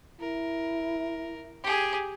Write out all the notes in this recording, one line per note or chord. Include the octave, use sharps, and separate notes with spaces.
E4 A#4
G4 G#4